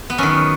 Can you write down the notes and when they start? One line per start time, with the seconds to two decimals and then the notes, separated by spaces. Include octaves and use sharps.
0.10 B3
0.18 F#2 D#3 C#4